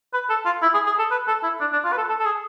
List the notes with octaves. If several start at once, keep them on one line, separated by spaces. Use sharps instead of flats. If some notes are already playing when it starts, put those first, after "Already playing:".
B4
A4
F4
E4
G#4
G#4
A4
B4
A4
E4
D4
D4
F4
B4
A4
A4
A4
G#4